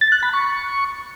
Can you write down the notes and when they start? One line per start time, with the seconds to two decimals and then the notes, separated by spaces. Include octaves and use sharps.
0.01 A6
0.12 F#6
0.23 B5
0.33 C#6